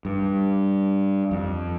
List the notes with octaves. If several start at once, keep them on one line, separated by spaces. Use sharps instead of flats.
G2
F2